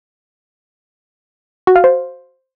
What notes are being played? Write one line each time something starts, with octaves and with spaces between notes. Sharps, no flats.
F#4
F5
C5